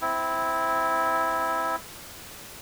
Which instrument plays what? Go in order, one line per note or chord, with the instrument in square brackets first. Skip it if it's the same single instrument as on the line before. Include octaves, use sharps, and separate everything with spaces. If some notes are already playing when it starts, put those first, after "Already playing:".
[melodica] C4 E4